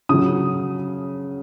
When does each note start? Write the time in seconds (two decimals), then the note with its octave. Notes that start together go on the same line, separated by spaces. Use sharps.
0.09 C#3 F#3 D#6